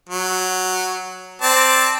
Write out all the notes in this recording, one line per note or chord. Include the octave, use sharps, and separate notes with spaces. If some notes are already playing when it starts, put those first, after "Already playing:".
F#3
C4 D5 A5